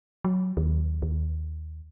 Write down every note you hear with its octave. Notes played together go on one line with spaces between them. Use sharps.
F#3
D#2
D#2